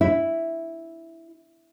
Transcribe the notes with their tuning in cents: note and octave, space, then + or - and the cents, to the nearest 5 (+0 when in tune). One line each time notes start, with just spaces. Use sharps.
E4 +0 E5 +0